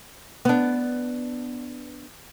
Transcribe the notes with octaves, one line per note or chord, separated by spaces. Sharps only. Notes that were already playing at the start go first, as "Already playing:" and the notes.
B3 D4